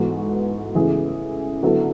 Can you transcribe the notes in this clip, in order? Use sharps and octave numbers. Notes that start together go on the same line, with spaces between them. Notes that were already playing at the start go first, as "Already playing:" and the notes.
Already playing: G#2 E3 B3 F#4 A4
C#3 E3 A3 E4 G#4
D3 F#3 B3 E4 A4